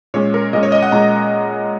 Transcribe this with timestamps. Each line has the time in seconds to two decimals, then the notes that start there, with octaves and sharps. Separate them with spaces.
0.14 A#2 G#3 C#4 C#5
0.34 A#4
0.53 A#2 G#3 C#4 D#5
0.63 C#5
0.72 D#5
0.82 F#5
0.92 A#2 G#3 C#4 A#5